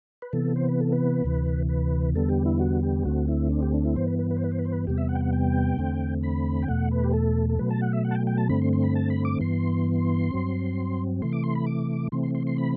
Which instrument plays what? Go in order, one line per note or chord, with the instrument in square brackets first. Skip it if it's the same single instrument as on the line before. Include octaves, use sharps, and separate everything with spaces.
[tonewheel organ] B4
C3 E3 B3 A4
C5
B4
A4
B4
D2 C3 E3
B4
E2 D3 G3 B3 A4
G4
E4
F#4
G4
D2 D3 A3 C4 F#4
E4
D4
G4
D4
E4
G2 E3 B3 C5
B4
B4
B4
C5
B4
C5
B4
C5
B4
E2 C3 G3 B3 G4
E5
F#5
G5
F#5
G5
E2 D3 A3 C4
B5
G5
E2 B2 A3 F#5
B4
G4
A4
A4
B2 F#3 A3 B4
A5
F#5
E5
F#5
A5
G5
G5
A5
G2 D3 A3 C4 B5
C6
C6
B5
A5
B5
D6
G2 E3 B3 C6
G2 F#3 C4
C3 E3 A3 C6
D6
C6
B5
D6
C3 E3 A3 C4 C6
C6
C6
C6
B5